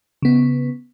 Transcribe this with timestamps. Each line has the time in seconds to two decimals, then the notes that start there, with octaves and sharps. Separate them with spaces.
0.22 C#3 B3